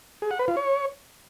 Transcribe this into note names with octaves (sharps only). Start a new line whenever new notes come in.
G#4
F#5
B4
F4
C#5